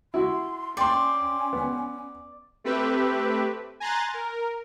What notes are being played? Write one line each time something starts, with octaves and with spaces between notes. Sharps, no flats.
E4 F#4 C6
C#4 D5 G5 C6
B3
A3 C4 G4 B4 E5
G#5 A#5 C6 F#6 A6
A#4